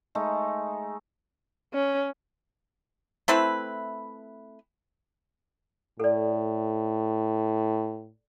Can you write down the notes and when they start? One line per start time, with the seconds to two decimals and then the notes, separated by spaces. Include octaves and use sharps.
0.15 G#3 A3 D#4
1.74 C#4
3.28 A3 C4 E4 B4
6.00 A2 A4 D5